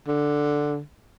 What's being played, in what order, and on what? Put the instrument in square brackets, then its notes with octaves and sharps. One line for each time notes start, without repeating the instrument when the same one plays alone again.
[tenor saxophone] D3